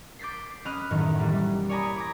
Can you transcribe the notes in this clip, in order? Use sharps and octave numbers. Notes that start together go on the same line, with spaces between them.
D6 G6 A6 B6 C7
C#4 D#5 B5 F6 F#6
E1 F#2 A2 D#3
E3 G3 A#3
C#5 D5 G#5 A#5 B5 D#6
B5 D6 G#6 A#6